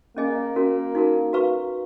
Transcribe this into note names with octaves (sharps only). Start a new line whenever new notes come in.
A#3 C#4 G#4 D#5 G#5
C#4 F#4 A#4
D#4 F#4 A#4
F#4 B4 F5 A#5 C#6